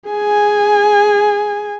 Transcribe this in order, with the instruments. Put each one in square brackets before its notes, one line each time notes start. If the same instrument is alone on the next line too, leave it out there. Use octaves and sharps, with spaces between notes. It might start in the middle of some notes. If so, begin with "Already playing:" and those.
[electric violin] G#4 G#5